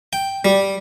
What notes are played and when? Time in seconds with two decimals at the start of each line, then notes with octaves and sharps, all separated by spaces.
0.13 G5
0.45 G3